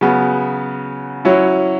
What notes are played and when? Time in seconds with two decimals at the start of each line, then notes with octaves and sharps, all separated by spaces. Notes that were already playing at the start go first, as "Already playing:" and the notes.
0.01 C#3 F#3 B3
1.25 F#3 C#4 E4